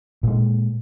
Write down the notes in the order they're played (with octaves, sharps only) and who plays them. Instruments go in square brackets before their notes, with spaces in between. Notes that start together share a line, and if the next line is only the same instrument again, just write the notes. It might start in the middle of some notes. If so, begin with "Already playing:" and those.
[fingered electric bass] A#2 G#3